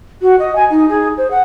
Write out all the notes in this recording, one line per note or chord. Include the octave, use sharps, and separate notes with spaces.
F#4
D#5
G#5
D#4
G#4
C5
F#5